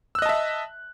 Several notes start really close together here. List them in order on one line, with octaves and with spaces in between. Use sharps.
E6 F#6 D#5 A5 E5